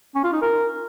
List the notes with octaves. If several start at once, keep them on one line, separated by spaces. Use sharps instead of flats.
C#4
F4
D#4
A#4